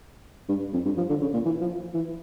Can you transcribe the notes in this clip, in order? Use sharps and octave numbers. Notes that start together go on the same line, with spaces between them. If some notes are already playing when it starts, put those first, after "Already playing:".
G2
F2
G2
F3
D3
C#3
A#2
E3
F3
E3